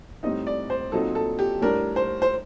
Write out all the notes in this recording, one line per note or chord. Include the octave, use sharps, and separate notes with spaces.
A2 G3 C4 D#4 D#5
D5
C5
A#2 F#3 C4 D#4 A4
A4
G4
A2 G3 D4 A#4
C5
C5